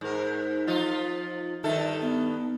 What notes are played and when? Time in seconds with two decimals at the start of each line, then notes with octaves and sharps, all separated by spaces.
0.01 G#2 A#4
0.67 F3 D#4 F4
1.64 G2 D#3 A4 E5
2.01 B3